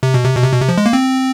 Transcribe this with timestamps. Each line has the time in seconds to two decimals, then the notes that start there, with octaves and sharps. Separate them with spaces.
0.03 C3
0.14 B2
0.25 C3
0.36 B2
0.44 C3
0.52 B2
0.61 C3
0.69 F3
0.78 G#3
0.86 A#3
0.93 C4